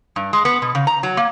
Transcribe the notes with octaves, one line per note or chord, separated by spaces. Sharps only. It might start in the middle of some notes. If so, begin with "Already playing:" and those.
G2
G#3
B3
B2
C#3
A#5
F#3
A#3